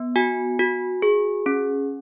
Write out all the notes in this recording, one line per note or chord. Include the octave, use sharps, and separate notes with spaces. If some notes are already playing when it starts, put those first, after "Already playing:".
Already playing: B3
F#4 G#5
F#4
G#4
C#4